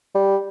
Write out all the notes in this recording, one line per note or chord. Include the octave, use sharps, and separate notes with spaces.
G3